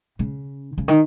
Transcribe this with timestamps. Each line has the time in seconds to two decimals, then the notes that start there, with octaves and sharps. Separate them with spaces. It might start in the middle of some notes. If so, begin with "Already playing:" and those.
0.19 C#3
0.78 C#3
0.88 D#3